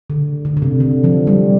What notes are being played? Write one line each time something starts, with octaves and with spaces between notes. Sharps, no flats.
D3
D3
D3
C3
D3
F3
G3